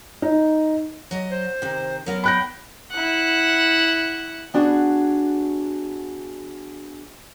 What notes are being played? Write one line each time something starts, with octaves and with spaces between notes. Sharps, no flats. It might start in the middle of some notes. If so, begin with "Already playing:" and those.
D#4
F#3 D#5
C5
C3 D#3
F#3 B3 A#4
G5 B5 F#6 A#6
E4 F#5
B3 D4 F#4 G#4